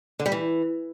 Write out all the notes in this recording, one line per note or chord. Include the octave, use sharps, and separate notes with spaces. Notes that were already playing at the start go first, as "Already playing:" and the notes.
D3
G3
E3